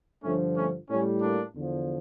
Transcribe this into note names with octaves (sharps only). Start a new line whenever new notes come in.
G2 D3 F3 A3 C#4
A3 C#4
A2 G3 A3 C#4
A#3 D4
E2 D3 F3